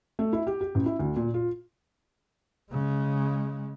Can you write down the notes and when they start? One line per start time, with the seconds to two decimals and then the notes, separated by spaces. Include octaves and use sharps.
0.19 A3
0.33 E4
0.47 G4
0.61 G4
0.75 A1
0.86 E4
0.99 D2
1.16 A#2
1.34 F4
2.71 C#3 G#3